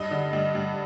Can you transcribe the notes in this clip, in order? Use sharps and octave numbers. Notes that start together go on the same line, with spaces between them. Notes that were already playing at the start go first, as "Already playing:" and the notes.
Already playing: G2 D#5
D3
G2
G2